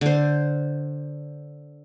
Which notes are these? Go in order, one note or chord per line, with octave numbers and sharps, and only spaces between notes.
D3 C5